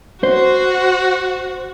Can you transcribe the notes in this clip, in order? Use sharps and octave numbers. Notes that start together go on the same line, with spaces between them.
F#4 C5